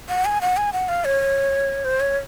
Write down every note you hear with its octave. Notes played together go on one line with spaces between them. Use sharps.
F#5
G#5
F#5
G#5
F#5
F5
C#5
C5
C#5